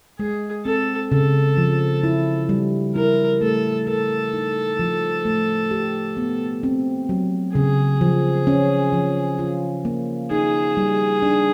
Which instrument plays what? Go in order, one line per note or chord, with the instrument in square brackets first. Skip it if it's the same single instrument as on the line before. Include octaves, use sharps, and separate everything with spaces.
[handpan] G#3 [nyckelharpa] G#4
[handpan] C4 [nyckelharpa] A4
[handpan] C#3 [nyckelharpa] A4
[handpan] F3
E4
G3
[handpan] E4 [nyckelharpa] A#4
[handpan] A3 [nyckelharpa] A4
[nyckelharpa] A4 [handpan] A#4
[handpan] D#4
F3
A3
G4
B3
C4
F#3
[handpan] C#3 [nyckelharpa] G#4
[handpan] F3
C#4
F3
F4
A#3
[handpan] D#4 [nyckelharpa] G#4
[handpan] G3
D4